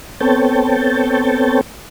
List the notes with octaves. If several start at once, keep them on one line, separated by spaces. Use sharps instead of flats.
B3 C4 A4 C#5 G5 A5